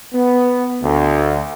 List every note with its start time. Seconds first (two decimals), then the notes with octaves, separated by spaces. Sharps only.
0.13 B3
0.82 D2